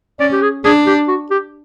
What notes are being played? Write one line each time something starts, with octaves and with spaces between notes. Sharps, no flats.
C#4 D5
G4
G#4
D4 G#4
G4
F#4
G4